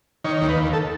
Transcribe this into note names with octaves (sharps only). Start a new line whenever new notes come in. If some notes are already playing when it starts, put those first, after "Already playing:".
D#3 C#5
D#2
B4
D#2
A4